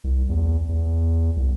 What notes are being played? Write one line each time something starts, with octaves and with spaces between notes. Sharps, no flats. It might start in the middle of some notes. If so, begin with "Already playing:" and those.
C2
E2
E2
C2